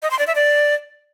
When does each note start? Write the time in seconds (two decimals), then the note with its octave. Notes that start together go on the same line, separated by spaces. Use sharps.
0.02 D#5
0.11 C6
0.19 D5
0.27 E5
0.35 D5